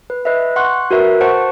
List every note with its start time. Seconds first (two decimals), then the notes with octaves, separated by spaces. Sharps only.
0.10 B4
0.25 B4 D#5 E5
0.56 F#5 C6 C#6 F#6
0.91 F#4 A#4 B4 E5
1.21 C5 F#5 A5 C#6